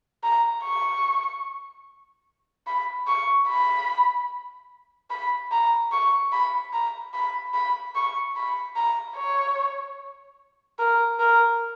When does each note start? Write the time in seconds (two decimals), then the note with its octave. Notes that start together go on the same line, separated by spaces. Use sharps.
0.23 A#5
0.63 C#6
2.67 B5
3.07 C#6
3.48 B5
5.10 B5
5.51 A#5
5.92 C#6
6.32 B5
6.73 A#5
7.14 B5
7.54 B5
7.95 C#6
8.36 B5
8.76 A#5
9.16 C#5
10.79 A#4
11.19 A#4